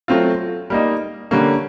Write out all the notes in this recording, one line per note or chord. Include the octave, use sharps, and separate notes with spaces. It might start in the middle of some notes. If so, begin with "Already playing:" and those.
F#3 A3 C4 F4
G3 A#3 D#4
D3 G3 A#3 C#4